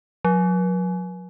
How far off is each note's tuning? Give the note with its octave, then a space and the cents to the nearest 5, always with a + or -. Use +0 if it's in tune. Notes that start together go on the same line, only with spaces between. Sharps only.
F#3 -35